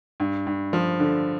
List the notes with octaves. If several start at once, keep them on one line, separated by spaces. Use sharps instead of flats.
G2
G2
F3
D3